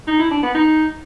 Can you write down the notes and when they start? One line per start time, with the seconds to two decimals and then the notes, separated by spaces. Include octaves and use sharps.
0.07 D#4
0.19 E4
0.31 D4
0.43 B3
0.54 D#4